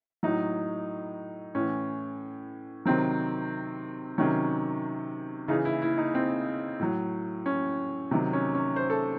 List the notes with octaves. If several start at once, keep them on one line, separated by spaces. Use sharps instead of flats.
A2 F#3 D#4
A2 E3 C#4
C3 D#3 F#3 C4
C3 D#3 F#3 C#4
C#3 E3 D#4
E4
E4
D#4
C4
A2 F#3
C#4
C3 D#3 F#3
C#4
C#4
C5
A4